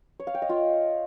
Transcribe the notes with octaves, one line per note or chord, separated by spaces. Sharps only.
C#5
F5
G5
D#5
F4